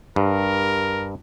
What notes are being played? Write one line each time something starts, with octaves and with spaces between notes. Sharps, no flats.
G2 A#4